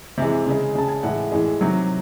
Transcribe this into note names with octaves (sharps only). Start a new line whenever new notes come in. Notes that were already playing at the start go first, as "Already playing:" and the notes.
C3 E3 G#3
C#3 G#3
C#3 G#3 A5
G#5
A2 E3 G#3 F#5
A2 E3 G#3
C3 D#3 F#3